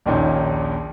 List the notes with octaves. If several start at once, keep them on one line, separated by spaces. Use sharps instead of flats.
A#1 D#2 A#2 C#4 D#4